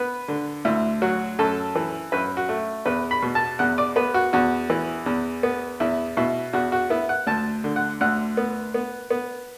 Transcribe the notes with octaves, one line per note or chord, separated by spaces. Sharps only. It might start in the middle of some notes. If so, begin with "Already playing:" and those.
Already playing: B3 B4
D3
D2 E4
F#3 F#4
F#2 A4
E3
F#2 B4
F#4
A3
E2 B4
B5
B2
A5
E2 F#5
D5
B3 B4
F#4
E2 F#4
E3
E2
B3
E2 E4
B2 E4
E2 F#4
F#4
B3 E4
F#5
D2 A5
D3
F#5
D2 F#5
B3
B3
B3